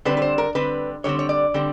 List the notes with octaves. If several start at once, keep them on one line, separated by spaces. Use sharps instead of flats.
D3 G3 C4 B4
B4
C5
A#4
D3 G3 C4 B4
D3 G3 C4 C#5
C#5
D5
D3 G3 C4